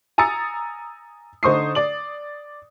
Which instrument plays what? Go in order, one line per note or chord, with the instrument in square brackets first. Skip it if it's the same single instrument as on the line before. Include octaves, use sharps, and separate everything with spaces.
[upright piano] G#5 A#5 D#6 E6 A6 C#7
D3 D#4 C5 C#6 D#6 C7
D5 F#7